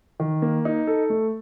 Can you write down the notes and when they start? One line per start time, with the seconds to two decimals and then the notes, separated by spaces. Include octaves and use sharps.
0.20 D#3
0.42 A#3
0.65 D#4
0.87 A4
1.10 A3